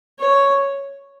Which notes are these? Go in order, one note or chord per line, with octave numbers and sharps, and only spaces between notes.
C#5